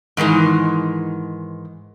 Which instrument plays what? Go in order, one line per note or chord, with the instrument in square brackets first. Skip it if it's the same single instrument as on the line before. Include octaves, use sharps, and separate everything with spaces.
[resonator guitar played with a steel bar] G#2 D#3 E3 G#3